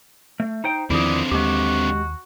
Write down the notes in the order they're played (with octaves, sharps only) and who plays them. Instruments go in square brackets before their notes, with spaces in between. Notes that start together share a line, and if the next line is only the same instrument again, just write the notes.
[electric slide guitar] A3
D#4 C5 G5
[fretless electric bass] E2 D#3 F3 [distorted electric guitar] D3 C4 [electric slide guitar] E4 G#4 [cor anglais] D5
[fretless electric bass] D#2 [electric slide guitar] G#3 G4 [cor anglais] F#4